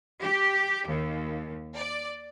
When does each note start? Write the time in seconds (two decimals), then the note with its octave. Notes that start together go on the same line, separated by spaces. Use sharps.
0.21 G4
0.87 D#2
1.75 D5